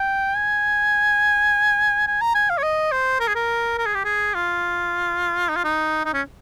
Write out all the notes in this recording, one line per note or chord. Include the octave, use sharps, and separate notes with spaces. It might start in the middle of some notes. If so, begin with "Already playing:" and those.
Already playing: G5
G#5
G#5
A#5
G#5
F5
C#5
D#5
C5
A#4
G#4
A#4
A#4
G#4
G4
G#4
F4
D#4
F4
D#4
D#4
C#4